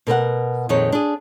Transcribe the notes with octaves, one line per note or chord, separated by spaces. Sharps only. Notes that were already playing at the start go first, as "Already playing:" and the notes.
B2 A#4 B4 F#5
F2 A#2 D#3 D#4 G#4 C#5
D4 G#4